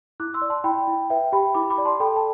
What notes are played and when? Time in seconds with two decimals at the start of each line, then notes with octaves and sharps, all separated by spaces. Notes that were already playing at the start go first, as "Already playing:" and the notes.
0.20 E4 D6 F#6
0.34 C6 E6
0.42 D5
0.50 A5 C6
0.64 E4 G5 B5
0.87 E4
1.10 B4 E5 G5
1.32 G4 G5 B5
1.54 E4 B5 D6
1.70 B5 D6
1.78 D5
1.85 A5 C6
2.00 A4 G5 B5
2.16 A5